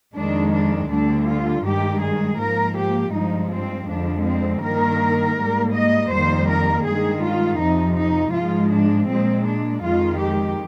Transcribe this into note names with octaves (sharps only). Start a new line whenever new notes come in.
F2 D#3 G#3 D4
D4
D2 D3 G3 D4
F4
G2 D#3 G#3 G4
G#4
G#2 F3 A#3 A#4
G4
G2 F3 G#3 D#4
C4
F2 D3 F3 G#3 D4
C4
G2 D#3 A#3 A#4
G#2 G3 A#3
D#5
F2 D#3 G3 A#3 C5
A#4
G2 D#3 G#3 G#4
F4
F2 C3 F3 D#4
D#4
G#2 F3 G#3 F4
D4
A#2 G#3 C4
D4
F2 D#3 G#3 F4
G4